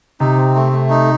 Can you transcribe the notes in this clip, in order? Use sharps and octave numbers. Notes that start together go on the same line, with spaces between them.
C3 D#4
C4
A3
A3
D#4